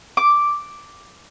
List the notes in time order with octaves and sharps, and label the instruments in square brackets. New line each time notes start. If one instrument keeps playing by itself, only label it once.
[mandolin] D6